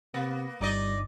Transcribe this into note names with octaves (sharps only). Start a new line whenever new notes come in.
C3 A#3 B3
G1 G3 D#4 D5 D#5